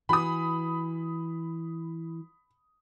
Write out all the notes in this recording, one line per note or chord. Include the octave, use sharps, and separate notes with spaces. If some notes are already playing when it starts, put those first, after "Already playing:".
E3 F#4 B5 D#6